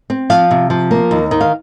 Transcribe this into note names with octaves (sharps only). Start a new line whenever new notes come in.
C4
F3 F5
C3
F3
A#3
D#2
D#3
F5